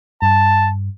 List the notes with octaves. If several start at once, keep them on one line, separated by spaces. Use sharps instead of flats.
G2 A5